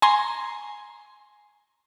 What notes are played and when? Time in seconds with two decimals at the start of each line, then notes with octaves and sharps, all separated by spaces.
0.02 G#5 A#5 C6